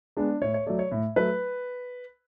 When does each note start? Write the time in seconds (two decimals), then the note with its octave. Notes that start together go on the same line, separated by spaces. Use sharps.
0.17 G#3 B3 D4
0.42 A2 C#5
0.54 C#5
0.66 F#3 A3 D5
0.79 C#5
0.92 A2
1.16 F#3 A3 B4